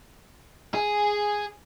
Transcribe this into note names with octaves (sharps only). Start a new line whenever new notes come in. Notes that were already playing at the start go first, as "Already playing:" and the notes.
G#4